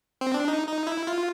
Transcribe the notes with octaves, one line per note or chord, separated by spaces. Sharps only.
C4
D4
D#4
D#4
E4
F4